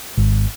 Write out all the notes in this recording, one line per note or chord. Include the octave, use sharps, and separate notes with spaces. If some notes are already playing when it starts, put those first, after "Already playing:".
G#1